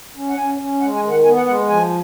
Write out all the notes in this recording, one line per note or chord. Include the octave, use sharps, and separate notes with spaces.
C#4
F#5
C#4 G#5
C#4
G#3 F#5
G#5
D#3
F#5
B3 G#5
F#5
G#3 F#5
F3 G#5